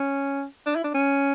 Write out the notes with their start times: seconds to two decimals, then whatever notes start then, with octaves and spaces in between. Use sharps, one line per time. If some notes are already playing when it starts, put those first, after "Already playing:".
Already playing: C#4
0.66 D4
0.76 E4
0.84 D4
0.94 C#4